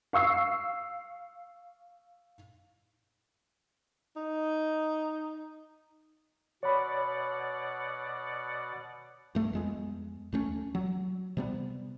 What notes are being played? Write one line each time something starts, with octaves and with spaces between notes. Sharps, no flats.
F5 C#6 E6 C7
D#4
B2 C#5 D5 F#5 B5
G2 A3
F2 G#3 B3
D#2 A3 C#4
F#3
C3 G3 B3